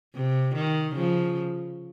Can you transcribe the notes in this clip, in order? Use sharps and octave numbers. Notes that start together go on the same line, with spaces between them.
C3
D#3
C#3 F3